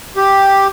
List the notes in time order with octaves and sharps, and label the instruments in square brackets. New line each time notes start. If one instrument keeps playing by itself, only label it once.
[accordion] G4